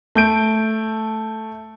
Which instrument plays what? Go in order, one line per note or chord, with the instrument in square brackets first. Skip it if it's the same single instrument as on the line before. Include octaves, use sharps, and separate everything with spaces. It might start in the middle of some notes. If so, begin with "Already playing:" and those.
[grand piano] A3 G6 D7